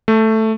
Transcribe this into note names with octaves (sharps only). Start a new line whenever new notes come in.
A3